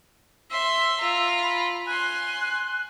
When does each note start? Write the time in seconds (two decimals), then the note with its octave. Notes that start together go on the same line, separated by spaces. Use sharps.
0.50 E5 C6 E6
1.00 F4 A#5
1.43 B5
1.87 G#5 C6 F#6